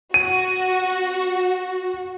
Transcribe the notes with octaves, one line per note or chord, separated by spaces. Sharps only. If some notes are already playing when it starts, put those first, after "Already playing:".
F#4 D#7